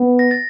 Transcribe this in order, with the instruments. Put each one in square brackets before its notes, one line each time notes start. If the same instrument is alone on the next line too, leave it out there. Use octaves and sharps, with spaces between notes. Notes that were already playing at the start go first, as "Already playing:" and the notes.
Already playing: [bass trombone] B3
[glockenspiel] A#6
A6